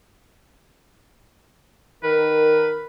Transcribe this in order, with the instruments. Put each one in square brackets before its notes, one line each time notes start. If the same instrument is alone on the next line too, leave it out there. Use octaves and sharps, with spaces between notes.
[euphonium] D#3 [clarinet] A#4 [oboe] B4